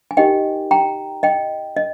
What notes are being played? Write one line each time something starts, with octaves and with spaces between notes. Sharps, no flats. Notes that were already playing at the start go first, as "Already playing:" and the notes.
G#5
D#4 G4 A#4 D#5 G5
G5 A#5
D#5 G5
D#5